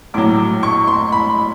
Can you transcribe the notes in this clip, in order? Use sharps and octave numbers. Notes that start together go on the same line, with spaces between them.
A#1 A2 F#3 D6
C#6
C6
B5